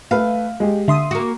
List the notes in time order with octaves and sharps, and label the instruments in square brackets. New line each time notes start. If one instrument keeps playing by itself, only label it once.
[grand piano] A3 B4 [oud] F5
[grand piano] G#3 G4
[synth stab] D3 C6 D#6 [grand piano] E5
[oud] A#3 F#4